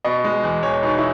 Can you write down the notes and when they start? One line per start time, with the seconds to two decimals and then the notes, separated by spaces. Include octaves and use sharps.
0.05 B2 D#5
0.24 G#3
0.44 E2
0.63 E1 C#5
0.83 B2 D#4
0.98 E4